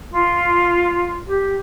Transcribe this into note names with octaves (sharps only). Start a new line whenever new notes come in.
F4
G4